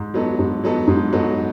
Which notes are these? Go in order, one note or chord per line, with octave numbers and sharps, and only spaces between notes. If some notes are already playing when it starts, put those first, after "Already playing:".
Already playing: G#2
F#3 B3 D#4 A4
G#2
F#3 B3 D#4 A4
G#2
F#3 B3 D#4 A4